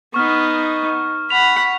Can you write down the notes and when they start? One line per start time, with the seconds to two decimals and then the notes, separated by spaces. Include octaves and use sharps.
0.14 B3 D#4 C#6 F6
1.30 F#5 B5 F7